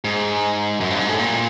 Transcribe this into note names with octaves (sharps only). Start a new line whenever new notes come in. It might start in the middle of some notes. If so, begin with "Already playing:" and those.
G#2
F#2
G2
G#2
A2
A#2